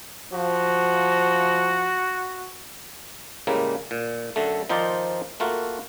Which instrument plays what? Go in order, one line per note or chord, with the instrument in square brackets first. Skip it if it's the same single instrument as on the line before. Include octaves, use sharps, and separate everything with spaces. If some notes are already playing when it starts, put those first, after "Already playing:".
[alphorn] F3 [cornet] F#4
[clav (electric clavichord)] A2 C#3 G3 G#3 A#3
A#2
F#2 D3 A3
D#3 F3 D#4 F4 C5 D5
A3 A#3 F4 F#4